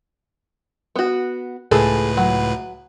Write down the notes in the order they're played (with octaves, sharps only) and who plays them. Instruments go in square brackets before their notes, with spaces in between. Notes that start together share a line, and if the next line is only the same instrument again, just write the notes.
[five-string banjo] B3 F#4
[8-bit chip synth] C#2 A2 B4 [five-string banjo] G#4 A4
[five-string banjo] F#3